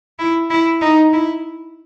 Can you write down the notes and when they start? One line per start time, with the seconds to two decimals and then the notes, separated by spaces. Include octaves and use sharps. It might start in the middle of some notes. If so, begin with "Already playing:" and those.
0.19 E4
0.50 E4
0.81 D#4
1.13 E4